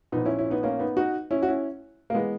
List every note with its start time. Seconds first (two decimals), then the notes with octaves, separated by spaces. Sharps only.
0.12 A#1 A#2 B3 D#4
0.26 C#4 E4
0.38 C#4 E4
0.50 B3 D#4
0.63 A#3 C#4
0.80 B3 D#4
0.97 D#4 F#4
1.31 C#4 E4
1.43 F#4
1.48 C#4 E4
2.10 A#3
2.14 E3 G#3 B3